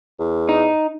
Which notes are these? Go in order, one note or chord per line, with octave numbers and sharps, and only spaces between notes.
E2
D#4